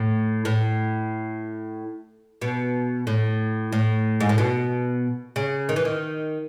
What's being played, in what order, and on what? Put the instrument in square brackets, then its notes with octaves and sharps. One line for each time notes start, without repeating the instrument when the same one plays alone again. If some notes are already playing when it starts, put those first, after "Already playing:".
Already playing: [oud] A2
A2
B2
A2
A2
G#2
A2
B2
C#3
D#3
E3
D#3